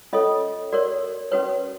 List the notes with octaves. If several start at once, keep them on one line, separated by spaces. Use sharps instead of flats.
C#4 F4 A4 C#5 D#5
F#4 A#4 C#5 D5
C#4 F#4 B4 C#5